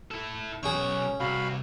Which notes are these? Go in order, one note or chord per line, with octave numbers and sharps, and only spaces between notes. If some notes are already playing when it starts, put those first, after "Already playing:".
E4 A4
B1 C#4 F#4 G#4 G5 C#6
C2 F#4 F5 B5